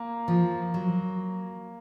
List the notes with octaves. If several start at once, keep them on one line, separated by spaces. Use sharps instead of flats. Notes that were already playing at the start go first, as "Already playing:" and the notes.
Already playing: A#3
F3
F#3